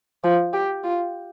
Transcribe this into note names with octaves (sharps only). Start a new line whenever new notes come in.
F3
G4
F4